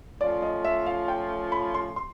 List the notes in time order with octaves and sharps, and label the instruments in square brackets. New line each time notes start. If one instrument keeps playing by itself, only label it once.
[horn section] F3 A3 C#4 F4 [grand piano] D5
[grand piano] D#5
E5
F5
G5
B5
C6
C6